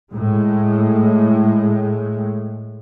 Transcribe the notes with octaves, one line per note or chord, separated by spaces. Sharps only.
A2 G#3